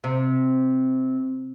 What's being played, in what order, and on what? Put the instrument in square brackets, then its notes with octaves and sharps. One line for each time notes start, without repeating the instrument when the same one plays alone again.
[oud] C3